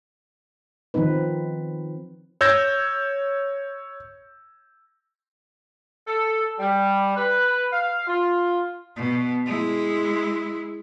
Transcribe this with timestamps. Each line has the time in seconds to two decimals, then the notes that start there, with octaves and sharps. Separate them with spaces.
0.94 D#3 F3 C4 D#4 B4
2.41 C#5 E6 G6 G#6 A#6
6.08 A4
6.60 G3
7.16 B4
7.72 F5
8.07 F4
8.96 B2
9.46 G#3 E4